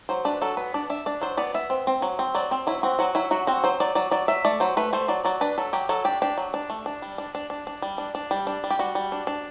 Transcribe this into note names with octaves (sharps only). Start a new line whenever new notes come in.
F#3 C5
D4 B4
F#3 A4
B3 B4
D4 D5
D4 E5
D4 D5
F#3 C5
B3 D5
B3 E5
C4
C4
F#3
C4
F#3 D5
C4
F#3 E4
C4 F#4
F#3 F#4
F#3 E4
F#3 F#4
C4 F#4
F#3 C5
F#3 D5
F#3 D5
F#3 D5
F#3 E5
A3 D5
F#3 C5
A3 B4
A3 C5
F#3 D5
F#3 D5
D4 B4
F#3 A4
F#3 G4
F#3 A4
D4 G4
D4 G4
F#3
D4
A3
D4
G3
D4
D4
D4
D4
G3
D4
D4
G3
D4
G3
G4
G3 F#4
G3
D4
D4